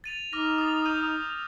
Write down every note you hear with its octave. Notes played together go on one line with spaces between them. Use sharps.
A6 D#7 F7
D#4 D6 F6 A#6
D#6 A6
E6 G6 D#7